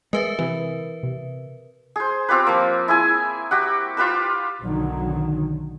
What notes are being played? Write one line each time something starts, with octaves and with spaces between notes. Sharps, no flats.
G#3 A#4 B4 E5
C3 E3
C3
G#4 C5
C4 F4 G4 B4
F3 A#3
E4 G#4 G#5
F#4 G4 F#5
F4 G4 B4 E6
B1 D3 D#3 F#3